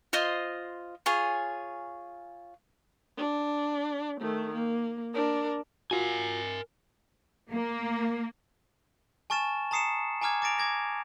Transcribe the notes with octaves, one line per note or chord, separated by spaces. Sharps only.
F4 C5 D#5 C6
F4 G#4 C#5 G#5
D4
D#3 A3
A#3
D4 A#4
F4 F#4 A#4 G#5
A#3
G#5 A5 C#6 F6 A6 E7
A5 A#5 D#6 C7 C#7 E7
G#5 A#5 D6 F6 G#6
D6 A6 A#6 D7 F7
D6 G#6 A#6